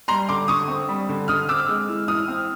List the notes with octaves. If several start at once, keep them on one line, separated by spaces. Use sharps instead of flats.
G3 A#5 C6
D3 C6 D6
D3 C#6 D#6
C4
G3
D3
D3 D#6 F6
C4 D6 E6
G#3
E3
E3 D#6 F6
C4